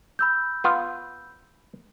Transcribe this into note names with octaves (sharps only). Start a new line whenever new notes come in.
B5 E6 G6
B3 F4